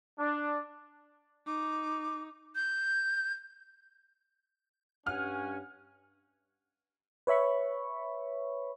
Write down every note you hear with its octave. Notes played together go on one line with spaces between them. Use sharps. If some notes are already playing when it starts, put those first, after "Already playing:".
D4
D#4 D6
G6
G2 C#4 F#5 G#5 F6
B4 C#5 E5 B5 C#6